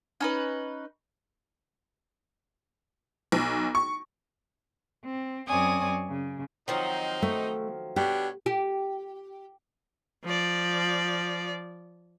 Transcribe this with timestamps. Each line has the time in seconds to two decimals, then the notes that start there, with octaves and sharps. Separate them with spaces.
0.20 C#4 D#4 B4
3.32 B1
3.75 C#6
5.03 C4
5.48 F#2 C4 C#5 D5 G#5 D#6
6.08 C#3
6.68 D#3 F3 F#3 C4 D#4
7.22 A3
7.96 B2 D4 G4 C#5
8.46 G4
10.24 F3 D5